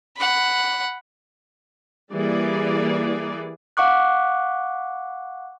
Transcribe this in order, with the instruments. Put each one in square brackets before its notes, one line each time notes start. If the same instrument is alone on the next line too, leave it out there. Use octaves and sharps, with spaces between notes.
[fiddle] F#5 B5
[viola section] E3 G3 A#3 G#4 D5
[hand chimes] F5 F#5 C#6 D6 F#6